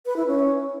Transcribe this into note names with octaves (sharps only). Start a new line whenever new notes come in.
B4
E4
C#4